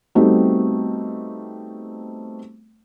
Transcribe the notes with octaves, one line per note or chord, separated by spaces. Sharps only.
G3 A3 B3 C4 D#4 F#4